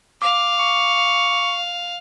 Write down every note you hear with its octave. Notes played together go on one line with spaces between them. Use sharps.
F5 D6
C#6